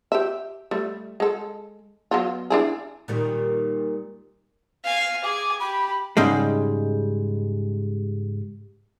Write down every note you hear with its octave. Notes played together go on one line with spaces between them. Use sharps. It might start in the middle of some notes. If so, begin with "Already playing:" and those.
G4 E5
G3 A3
G#3 A4
F#3 B3 F4
D4 E4 G#4
A#2 D#3 G3
F5 G#5
G#4 G#5 D6
G4 B5
G#2 C#3 G3 G#3